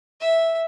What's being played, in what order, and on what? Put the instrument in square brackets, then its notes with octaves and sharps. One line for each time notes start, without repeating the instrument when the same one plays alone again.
[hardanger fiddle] E5